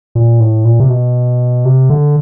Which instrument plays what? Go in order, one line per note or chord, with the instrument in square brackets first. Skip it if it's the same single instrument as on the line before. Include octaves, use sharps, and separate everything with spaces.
[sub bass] A#2
A2
A#2
C3
B2
C3
D3